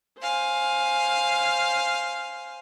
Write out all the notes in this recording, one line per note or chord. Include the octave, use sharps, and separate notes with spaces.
C5 F5 G#5